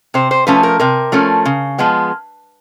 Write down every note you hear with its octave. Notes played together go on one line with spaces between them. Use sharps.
C3 C5
C5
F3 A3 C#4 B4
A#4
C3 A#4
F3 A3 C#4
C#3
F3 G#3 B3